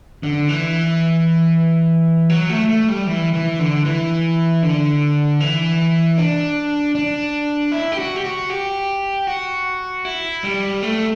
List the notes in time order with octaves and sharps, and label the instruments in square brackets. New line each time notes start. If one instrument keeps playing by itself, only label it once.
[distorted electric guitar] D3
E3
F#3
A3
A3
G3
E3
E3
D3
E3
D3
E3
D4
D4
E4
G4
F#4
G4
F#4
G4
F#4
E4
G3
A3